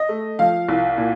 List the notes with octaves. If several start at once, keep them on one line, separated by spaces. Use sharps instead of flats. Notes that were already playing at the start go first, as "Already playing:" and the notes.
Already playing: D#5
A3
F3 F5
C2
A#2